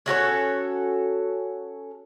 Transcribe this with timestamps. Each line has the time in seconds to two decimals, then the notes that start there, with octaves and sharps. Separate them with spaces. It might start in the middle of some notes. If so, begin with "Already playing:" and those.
0.06 C#4 F#4 A4 C#5